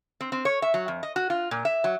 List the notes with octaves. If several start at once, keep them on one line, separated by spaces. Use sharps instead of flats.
C4
C4
C#5
E5
F#3
F2
D#5
F#4
F4
A#2
E5
F#3